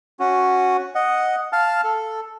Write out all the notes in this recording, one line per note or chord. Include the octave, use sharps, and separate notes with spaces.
C#4 F#4
D#5 F#5
F5 A5 F6
A4